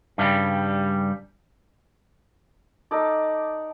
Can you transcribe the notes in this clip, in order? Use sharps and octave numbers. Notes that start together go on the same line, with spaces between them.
G2 C#3 G3
D#4 A4 D5